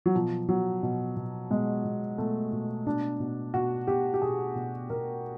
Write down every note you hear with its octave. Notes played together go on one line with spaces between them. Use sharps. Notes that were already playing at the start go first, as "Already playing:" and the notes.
F#3
B2 F3
B2 F#3
B2
B2
B2 G#3
B2
B2 A3
B2
B2 D4
B2
B2 F#4
B2 G4
G4
B2 G#4
B2
B2 A#4